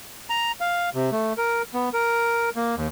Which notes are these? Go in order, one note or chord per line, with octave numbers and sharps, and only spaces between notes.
A#5
F5
C3
A3
A#4
B3
A#4
A#3
D#2